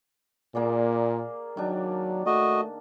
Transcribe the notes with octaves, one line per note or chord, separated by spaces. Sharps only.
A#2 A#3 G#4 D5
D#3 F#3 D4
A3 F#4 D#5